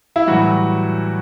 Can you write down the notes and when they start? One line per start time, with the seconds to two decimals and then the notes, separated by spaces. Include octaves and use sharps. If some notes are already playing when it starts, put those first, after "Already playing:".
0.16 E4
0.27 A2 E3 F#3 G3 F#4